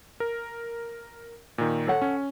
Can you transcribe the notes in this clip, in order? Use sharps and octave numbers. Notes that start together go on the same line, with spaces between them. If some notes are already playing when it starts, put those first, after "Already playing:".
A#4
A#2 D#3
A4 C#5 F#5
C#4